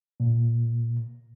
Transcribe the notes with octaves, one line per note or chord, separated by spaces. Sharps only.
A#2